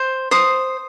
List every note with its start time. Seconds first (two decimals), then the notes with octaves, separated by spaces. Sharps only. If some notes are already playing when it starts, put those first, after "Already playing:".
Already playing: C5
0.31 C5 D#6